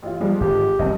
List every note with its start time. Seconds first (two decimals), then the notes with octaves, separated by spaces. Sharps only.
0.02 A1 F4
0.21 F3 G3 G#3
0.41 G#1 D3 G4
0.79 F1 B1 G2 C4 D#5